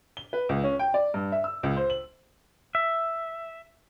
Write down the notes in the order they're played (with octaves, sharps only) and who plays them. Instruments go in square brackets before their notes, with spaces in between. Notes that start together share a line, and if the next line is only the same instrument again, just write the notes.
[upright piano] G7
B4
C#2
C#4
G5
D5
G2
E5
E6
C#2
C5
F#7
[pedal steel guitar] E5